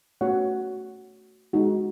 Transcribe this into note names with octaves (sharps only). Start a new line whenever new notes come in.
A3 C#4 F#4 C#5 F#5
G#3 D#4 F#4